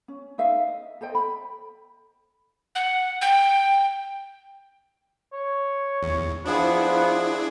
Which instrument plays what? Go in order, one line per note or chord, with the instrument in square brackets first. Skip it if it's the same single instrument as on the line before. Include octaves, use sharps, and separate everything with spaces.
[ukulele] C#4
D#4 B4 E5 F5
D#5
A4 C5 D#5 G5
B5
[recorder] F#5
G5
[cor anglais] C#5
[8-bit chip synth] E2
[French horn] F3 [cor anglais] B3 [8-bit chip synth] D4 E4 G#4